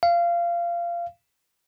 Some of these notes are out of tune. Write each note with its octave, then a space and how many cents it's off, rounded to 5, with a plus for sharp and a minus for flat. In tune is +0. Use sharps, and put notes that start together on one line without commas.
F5 -20